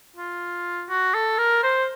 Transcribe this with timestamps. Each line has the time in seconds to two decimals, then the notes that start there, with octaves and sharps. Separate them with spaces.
0.17 F4
0.89 F#4
1.14 A4
1.38 A#4
1.63 C5